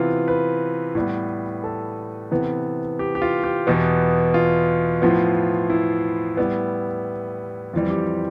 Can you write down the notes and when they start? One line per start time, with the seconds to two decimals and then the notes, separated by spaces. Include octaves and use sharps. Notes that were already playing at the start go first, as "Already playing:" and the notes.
Already playing: C3 E3 B3 F4
0.28 B4
0.95 A2 G3 B3
1.64 A4
2.31 C3 E3 B3
2.99 G4
3.15 G4
3.22 F4
3.44 G4
3.67 E2 B2 B3
4.34 F4
5.02 A2 F3 B3
5.70 E4
6.37 A2 G3 B3
7.74 F2 E3 G3 F4
7.90 G4